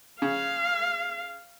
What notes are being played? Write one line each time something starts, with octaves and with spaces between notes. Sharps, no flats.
C#3 F5